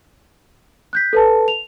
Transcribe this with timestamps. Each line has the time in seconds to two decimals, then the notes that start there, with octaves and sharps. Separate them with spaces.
0.93 F#6 G6 B6
1.13 A4 B4 A5
1.48 F7